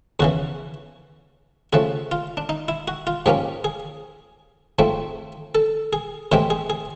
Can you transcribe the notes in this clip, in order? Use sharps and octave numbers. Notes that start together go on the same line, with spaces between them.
E2 C#3 E3 F#4
C#3 F3 A3 F#4
F4
D4
D#4
E4
F#4
F4
G#2 F3 A#3 C#4 G4
G#4
G#2 F3 A3 C4
A4
G#4
A2 E3 G#3 C4 G4
G#4
G#4